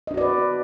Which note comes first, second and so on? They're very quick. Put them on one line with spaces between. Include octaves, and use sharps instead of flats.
D#5 D4 F#4 D5 B4